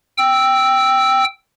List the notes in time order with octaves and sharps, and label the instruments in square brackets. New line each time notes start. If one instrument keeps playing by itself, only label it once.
[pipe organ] G5 E6